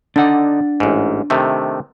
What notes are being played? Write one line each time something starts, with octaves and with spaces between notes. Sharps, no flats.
D3 D4 D#4 F#5
A1 G#2
C3 D#3 A3